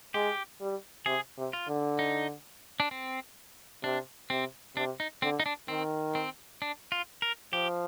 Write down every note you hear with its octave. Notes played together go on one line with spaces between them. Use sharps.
G#3 G4
G3
C3 G#4
C3
F4
D3
D#4
D4
C4
C3 D4
C3 C4
C3 D4
D#4
D3 C4
D#4
D4
D#3 C4
C4
D4
F4
A#4
F3 G4